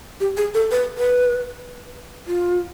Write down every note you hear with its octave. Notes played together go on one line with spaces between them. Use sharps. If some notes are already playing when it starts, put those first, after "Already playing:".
G4
G#4
A4
B4
B4
F4